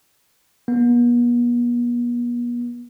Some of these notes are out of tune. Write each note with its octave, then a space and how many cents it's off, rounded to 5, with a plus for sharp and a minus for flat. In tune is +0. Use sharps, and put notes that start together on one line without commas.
B3 -45